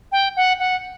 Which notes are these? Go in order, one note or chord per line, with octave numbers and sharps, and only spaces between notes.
G5
F#5
F#5